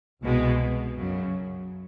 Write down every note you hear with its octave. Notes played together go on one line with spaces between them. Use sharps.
C2 B2 G#3
F#2 C#3 F#3